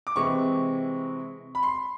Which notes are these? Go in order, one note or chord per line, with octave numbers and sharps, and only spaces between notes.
D6
C3 E3 G#3 C4 C#6
B5
C6